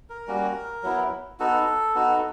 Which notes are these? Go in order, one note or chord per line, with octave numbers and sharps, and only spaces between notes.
A#4
G3 A#3 C#4 F#4
F#3 B3 E4
B3 D#4 F#4 A4
B3 D#4 F#4